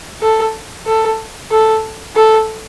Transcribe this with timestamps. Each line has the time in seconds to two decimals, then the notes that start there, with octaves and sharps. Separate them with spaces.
0.22 A4
0.86 A4
1.51 A4
2.16 A4